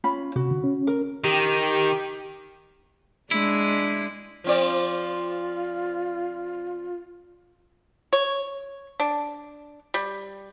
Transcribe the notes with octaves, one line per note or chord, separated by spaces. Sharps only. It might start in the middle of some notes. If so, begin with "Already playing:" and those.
C#4 F4 B5
C3 F#4
D3
C#4
A#4
D#3 G4
G#3 D4 E4
F3 C4 F4 D5
C#5
D4
G3